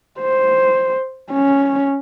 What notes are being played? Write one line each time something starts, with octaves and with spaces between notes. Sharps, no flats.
C5
C#4